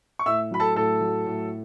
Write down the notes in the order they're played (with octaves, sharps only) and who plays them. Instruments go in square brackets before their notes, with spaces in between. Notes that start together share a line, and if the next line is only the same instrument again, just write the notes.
[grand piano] C#6
A2 E5 E6
F#3 B5
A4 A5
A2 A4 A5
F#3
A2